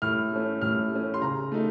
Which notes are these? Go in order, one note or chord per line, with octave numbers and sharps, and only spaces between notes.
A2 F6
A3 C#4
A2 F6
A3 C#4
C6
C#3 A#5
A3 D#4